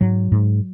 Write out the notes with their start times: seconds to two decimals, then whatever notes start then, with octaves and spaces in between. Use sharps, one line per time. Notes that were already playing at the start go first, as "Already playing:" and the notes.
0.01 G#2 F#3
0.32 G#2